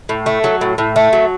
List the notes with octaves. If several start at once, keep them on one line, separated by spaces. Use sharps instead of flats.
A2
A3
F#3
A2
A2
A3
F#3